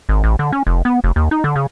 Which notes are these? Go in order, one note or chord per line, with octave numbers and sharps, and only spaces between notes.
G#1
A1
D3
C#4
F1
B3
F1
D#2
D#4
D3
C#3